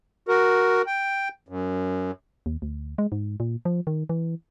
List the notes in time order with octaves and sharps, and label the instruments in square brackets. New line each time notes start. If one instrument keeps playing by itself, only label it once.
[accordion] F#4 A#4
G5
F#2
[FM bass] D#2
D2
G#3
G#2
A#2
F3
D#3
E3